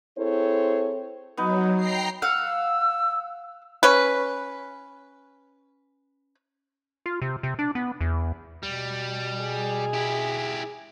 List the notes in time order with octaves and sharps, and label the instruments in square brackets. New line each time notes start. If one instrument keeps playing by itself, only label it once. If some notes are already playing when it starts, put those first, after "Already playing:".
[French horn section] C4 E4 G#4 A4 C5 C#5
[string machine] F#3 [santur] B3 D#4
[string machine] G5 A#5 C7
[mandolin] F5 F#5 [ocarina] E6
[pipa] C#4 B4
[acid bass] F4
C3
C3
D4
B3
E2
[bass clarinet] B2 [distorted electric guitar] G3
[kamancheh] G#4
[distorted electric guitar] E4 G4